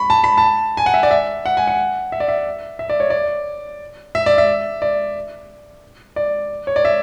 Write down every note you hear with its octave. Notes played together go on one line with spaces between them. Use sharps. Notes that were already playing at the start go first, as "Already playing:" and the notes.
Already playing: B5 C#6
A5
B5
A5
G#5
F#5
E5
D5
E5
F#5
G#5
F#5
E5
D5
E5
E5
D5
C#5
D5
E5
D5
E5
D5
D5
C#5
D5
E5